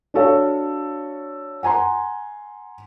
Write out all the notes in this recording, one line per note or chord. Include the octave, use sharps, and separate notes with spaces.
D4 F#4 A4 C#5 F5
F#5 G#5 A#5 C6